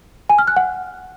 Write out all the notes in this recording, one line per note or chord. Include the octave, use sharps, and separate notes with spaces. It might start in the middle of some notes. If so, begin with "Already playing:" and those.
G#5
F6
F#6
F#5